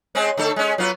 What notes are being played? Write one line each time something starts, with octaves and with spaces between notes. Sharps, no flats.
G#3 C4 C#4
D3 A3 A4
G#3 C#4
F#3 B3 F4